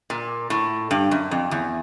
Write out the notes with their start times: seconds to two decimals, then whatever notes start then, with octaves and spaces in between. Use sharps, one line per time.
0.10 A#2
0.50 A2
0.91 G2
1.11 F#2
1.31 F2
1.51 E2